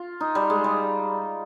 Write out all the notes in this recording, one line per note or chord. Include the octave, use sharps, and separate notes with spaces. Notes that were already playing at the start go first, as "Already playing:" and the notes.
Already playing: F4
D#4
G3
G#3
G3